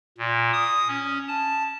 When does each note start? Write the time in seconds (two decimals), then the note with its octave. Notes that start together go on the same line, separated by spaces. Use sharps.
0.18 A#2
0.53 D#6
0.88 C#4
1.28 A5